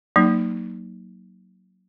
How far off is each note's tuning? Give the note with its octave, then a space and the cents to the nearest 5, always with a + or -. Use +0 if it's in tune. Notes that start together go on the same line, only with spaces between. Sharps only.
F#3 +5 A#3 +0 D#4 +0